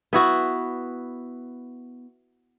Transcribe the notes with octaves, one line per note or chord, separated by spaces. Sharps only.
B3 E4 F#4